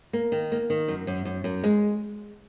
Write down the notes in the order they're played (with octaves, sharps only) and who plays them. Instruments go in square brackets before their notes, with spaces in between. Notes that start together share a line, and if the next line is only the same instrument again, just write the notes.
[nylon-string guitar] A#3
D#3
A#3
D#3
F#2
F#2
F#2
F#2
G#3